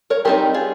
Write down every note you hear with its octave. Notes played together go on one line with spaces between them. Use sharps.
A#4 C#5
G3 C4 D#4 G4 A#4
F4 G#4